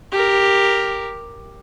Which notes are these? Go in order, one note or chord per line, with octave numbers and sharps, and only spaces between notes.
G4 A#4